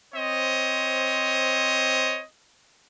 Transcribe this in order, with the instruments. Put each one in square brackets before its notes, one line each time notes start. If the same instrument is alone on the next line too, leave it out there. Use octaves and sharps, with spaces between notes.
[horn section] C4 C5 C#5 D#5